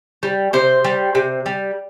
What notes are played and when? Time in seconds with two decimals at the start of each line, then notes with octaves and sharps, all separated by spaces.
0.23 G3
0.53 C3 C5
0.85 G3
1.15 C3
1.46 G3